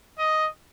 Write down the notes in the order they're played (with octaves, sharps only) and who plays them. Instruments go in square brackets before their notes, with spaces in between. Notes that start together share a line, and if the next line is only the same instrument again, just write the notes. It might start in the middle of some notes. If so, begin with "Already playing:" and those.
[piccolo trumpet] D#5